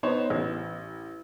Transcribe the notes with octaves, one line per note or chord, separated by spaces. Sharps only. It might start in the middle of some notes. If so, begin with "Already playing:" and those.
B3 D#4 C5 C#5
A1